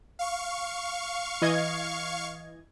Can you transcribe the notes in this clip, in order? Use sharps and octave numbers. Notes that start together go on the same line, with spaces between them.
F5 C#6
E3 D#5 G#6